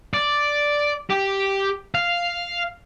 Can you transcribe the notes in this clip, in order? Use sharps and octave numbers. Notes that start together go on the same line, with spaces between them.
D5
G4
F5